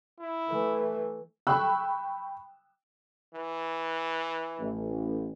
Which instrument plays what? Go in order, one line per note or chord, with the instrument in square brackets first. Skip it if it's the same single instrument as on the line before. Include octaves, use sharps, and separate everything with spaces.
[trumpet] E4
[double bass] E3 A3
[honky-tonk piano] G5 B5 C#6 E6 F#6
[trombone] E3
[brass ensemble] A1